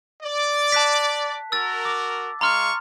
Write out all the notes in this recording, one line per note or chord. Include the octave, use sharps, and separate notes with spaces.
D5
A5 F#6 B6
F#4 A#4 E6 A6
D6
G#3 F5 A#5 C6 C#6 F6